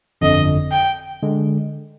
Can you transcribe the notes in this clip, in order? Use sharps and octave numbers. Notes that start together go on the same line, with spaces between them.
G1 F2 D3 D#5
G5
D3 G#3